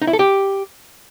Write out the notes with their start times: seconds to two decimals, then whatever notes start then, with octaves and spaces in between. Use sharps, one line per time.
0.02 D#4
0.07 E4
0.13 A4
0.19 G4